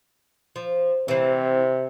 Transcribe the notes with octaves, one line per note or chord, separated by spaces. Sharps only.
F3
C3 E3 C4